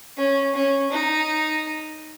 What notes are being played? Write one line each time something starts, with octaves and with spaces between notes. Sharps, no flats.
C#4
C#4
D#4